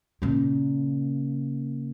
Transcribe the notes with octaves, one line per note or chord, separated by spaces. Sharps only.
A#2 C#3